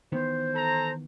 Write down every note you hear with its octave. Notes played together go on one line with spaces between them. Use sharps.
D#3 E3 B3 C5
A4 A#5